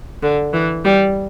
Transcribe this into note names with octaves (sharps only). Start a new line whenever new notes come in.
D3
E3
G3